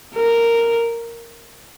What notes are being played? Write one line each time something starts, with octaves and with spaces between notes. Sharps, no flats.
A#4